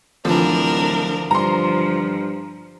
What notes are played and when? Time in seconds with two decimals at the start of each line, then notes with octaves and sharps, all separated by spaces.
0.25 D1 D3 E3 F3 D4 A#4
1.31 G2 F3 A#5 C6